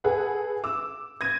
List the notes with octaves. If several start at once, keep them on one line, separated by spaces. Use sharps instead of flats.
G#4 A4 B4 F#5
D6 E6
G#6 A#6 D#7